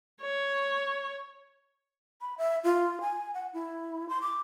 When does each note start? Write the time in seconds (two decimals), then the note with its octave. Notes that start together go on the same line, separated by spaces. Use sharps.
0.22 C#5
2.21 B5
2.38 E5
2.64 F4
3.01 G#5
3.34 F#5
3.53 E4
4.09 C6
4.22 D6